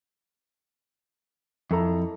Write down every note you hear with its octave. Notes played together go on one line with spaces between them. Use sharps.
F2 E4 A4 A#5